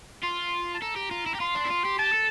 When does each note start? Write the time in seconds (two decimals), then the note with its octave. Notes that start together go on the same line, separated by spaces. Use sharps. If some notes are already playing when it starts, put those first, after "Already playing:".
0.23 F4 C6
0.74 A5
0.82 A4 A#5
0.96 G4
1.11 F4
1.26 E4
1.35 G4
1.40 F4 C6
1.55 D4
1.65 E4
1.70 F4
1.85 G4
1.99 G4 A5
2.13 A4